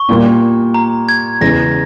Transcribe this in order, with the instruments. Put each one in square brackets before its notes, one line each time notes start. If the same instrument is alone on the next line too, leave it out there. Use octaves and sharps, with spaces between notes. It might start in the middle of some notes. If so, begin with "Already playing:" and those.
Already playing: [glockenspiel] C#6
[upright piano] A#2 G3 A#3
[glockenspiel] A#5
G#6
[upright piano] E2 C#3 G#3 [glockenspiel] A#6